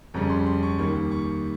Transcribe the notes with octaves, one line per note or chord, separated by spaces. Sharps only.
F2 C#3 G3 C#4 A#5
C6
C6
C#6
D#2 D#3 G3 A#3 C#6
C#6